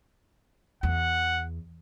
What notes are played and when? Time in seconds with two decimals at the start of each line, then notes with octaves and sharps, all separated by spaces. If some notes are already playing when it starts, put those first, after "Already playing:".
0.83 E2 F#5